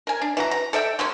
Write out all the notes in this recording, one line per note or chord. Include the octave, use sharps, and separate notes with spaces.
A#4 G#5
D4
E3 F#4 A#5
A#5
A4 D5 E5 G5
F#3 G#3 A#3 C#4